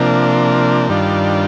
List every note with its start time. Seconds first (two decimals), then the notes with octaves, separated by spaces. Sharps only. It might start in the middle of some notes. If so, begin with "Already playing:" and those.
Already playing: C3 F3 A#3 D4
0.90 G2 D#3 G3 D4 F4